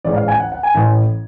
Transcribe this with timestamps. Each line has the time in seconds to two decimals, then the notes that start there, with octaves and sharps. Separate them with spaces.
0.05 A1 G#2 D5
0.16 F5
0.28 G#5
0.40 F#5
0.52 F#5
0.63 G#5
0.75 A1 A2